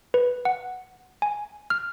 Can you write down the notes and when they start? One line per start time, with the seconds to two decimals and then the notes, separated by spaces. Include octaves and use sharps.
0.14 B4
0.45 F#5
1.22 G#5
1.70 F6